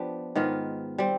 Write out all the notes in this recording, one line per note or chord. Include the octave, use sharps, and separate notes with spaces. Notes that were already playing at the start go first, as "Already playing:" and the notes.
Already playing: F3 B3 D4 G4
G#2 D#3 B3 F4
G3 C4